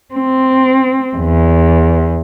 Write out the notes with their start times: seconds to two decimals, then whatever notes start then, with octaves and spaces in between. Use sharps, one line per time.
0.14 C4
1.17 E2